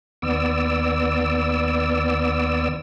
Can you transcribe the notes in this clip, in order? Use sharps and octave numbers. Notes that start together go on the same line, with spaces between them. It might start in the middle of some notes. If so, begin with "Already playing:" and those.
D#2 B3 D5 E6